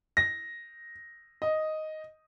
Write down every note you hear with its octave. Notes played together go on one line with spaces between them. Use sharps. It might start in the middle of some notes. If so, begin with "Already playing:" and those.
A#6
D#5